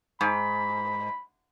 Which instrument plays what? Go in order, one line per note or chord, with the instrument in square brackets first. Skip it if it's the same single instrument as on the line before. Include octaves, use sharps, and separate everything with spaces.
[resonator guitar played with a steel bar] G#2 [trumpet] B5